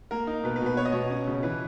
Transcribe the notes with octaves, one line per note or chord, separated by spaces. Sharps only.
A#3 A#4
D#4
B2 B4
B4
B2
B4
B3 C#5
D#5
B2 C#5
C#4
C#3
E3 B4